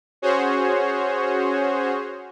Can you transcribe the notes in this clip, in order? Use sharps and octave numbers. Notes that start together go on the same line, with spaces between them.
C#4 F#4 G#4 C5 C#5